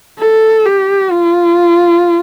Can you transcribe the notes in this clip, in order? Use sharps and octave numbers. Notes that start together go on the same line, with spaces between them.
A4
G4
F4